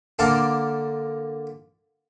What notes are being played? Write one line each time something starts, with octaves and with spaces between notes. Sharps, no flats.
D3 A#3 F5 A5 C6 D6